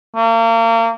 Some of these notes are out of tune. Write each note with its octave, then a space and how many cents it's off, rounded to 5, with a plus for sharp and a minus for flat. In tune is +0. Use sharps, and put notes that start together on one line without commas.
A#3 -35